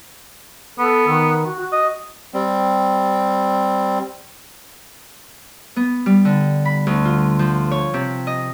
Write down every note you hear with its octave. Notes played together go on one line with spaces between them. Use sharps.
B3 A4
D#3
F#4
F#4
D#5
G3 C4
B3
G3
D3
B5
D2
F4
F3
C#5
C3
D#5